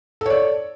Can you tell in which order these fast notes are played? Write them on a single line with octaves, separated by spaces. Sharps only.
A4 C#5 D5